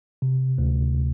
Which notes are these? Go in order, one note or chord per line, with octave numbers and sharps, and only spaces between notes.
C3
D2